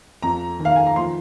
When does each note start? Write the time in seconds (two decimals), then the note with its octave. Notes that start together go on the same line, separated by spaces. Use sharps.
0.22 F2 A#5
0.60 D#3
0.65 F5
0.76 G#5
0.86 A#5
0.96 F3 C6